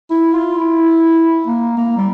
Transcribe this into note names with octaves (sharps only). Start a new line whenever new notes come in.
E4
F4
E4
A#3
A#3
G3